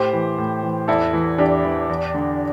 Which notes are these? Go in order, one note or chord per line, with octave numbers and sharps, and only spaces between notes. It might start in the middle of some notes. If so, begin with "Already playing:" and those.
Already playing: A2 G4 C5
E3
A2
E3
E2 E4 A4
E3
E2 D4 G4
E3
E2
D3